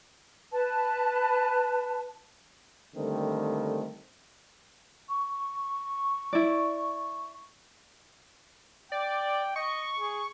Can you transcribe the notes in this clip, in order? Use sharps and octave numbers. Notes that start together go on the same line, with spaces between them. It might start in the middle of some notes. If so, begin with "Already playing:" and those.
B4 A5
D3 D#3 G3 A3 A#3 C4
C#6
E4 D5
D5 G5
D#5 C#6
G#4